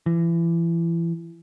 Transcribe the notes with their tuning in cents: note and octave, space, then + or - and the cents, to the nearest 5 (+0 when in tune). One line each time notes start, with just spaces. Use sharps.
E3 +30